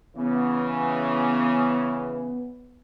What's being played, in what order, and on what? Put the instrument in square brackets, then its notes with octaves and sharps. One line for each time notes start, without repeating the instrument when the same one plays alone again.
[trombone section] C#3 E3 [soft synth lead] B3